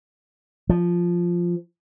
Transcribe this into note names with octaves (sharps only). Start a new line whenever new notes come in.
F3